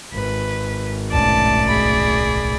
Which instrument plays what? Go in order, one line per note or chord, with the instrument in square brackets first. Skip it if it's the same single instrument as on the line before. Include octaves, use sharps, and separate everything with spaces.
[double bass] G#1 [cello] B4
[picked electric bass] D1 B1 C#4 [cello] A3 D5 [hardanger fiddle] A5
[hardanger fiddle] G#4 B5